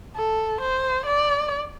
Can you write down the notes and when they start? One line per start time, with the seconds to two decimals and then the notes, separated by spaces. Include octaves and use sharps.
0.16 A4
0.61 C5
1.06 D5